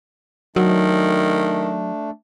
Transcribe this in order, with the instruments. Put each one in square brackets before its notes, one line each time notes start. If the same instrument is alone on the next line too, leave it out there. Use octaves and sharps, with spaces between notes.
[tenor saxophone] D#3 [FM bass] F#3 [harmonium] A3 D4